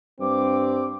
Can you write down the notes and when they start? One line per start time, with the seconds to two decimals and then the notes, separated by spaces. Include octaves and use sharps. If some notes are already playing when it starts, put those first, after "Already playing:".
0.20 G2 C4 D6